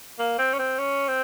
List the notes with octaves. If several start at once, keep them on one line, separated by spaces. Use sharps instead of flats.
A#3
C4
C#4
C4
C#4
C4